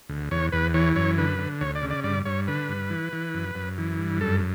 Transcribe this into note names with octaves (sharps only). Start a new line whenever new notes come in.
D2
E2 C#5
E2 B4
E3 C#5
F#2 C#5
D3 B4
D3
D2 C#5
D5
C#3
D5
G2 D5
G2 C#5
D3 B4
G2
E3
E3
F#2
F#2
E3
G2
F#2 A4